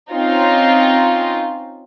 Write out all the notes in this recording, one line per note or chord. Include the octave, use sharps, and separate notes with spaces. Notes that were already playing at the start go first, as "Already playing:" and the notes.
C4 C#4 D#4 F4